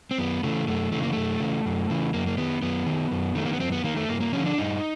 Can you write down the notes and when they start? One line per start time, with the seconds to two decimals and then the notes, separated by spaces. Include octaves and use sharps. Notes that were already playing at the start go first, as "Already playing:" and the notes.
0.11 C4
0.18 F#2 B3
0.43 C#3 E3 A3
0.67 F#2 A3
0.92 C#3 E3 A3
1.03 A#3
1.13 F#2 A3
1.40 C#3 E3
1.66 F#2
1.90 C#3 E3
2.14 F#2 A#3
2.27 A#3
2.38 D#3 B3
2.62 F#2 B3
2.86 D#3
3.11 F#2
3.35 D#3 A3
3.46 A#3
3.53 B3
3.60 F#2 C4
3.72 B3
3.84 D#3 A#3
3.97 A3
4.09 G2 A#3
4.20 A#3
4.33 D3 F3 C#4
4.46 D4
4.58 G2 D#4